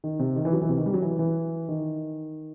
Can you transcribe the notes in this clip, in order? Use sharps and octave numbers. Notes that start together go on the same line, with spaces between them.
D#3
C3
D#3
E3
F#3
E3
C3
D#3
G3
F#3
E3
E3
D#3